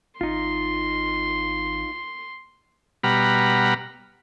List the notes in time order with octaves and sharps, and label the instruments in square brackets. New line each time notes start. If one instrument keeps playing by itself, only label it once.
[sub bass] G#1 [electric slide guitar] D#4 F4 [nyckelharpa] C6
[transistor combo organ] B2 G3 F#5 A#5 B5 F6